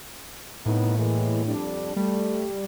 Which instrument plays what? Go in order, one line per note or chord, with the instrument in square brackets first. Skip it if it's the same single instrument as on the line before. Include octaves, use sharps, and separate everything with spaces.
[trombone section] C2 B3 D#4 [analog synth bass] A2
[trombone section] E3 G#3 A#3
F2 G3 D4
[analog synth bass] G3 [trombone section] A3